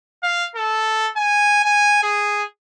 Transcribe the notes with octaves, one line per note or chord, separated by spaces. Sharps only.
F5
A4
G#5
G#5
G#4